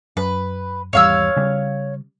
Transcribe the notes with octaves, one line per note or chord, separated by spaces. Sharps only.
F#2 B4
G#1 E2 G3 C#5 F5 E6
C#3 G3